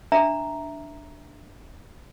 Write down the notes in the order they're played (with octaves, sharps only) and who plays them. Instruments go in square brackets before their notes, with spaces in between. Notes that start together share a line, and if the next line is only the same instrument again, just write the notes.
[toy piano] D4 E5 A#5